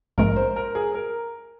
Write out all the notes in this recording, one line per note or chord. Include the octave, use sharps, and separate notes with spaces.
A#1 G#2 G#3 A#4
C5
A#4
G#4
A#4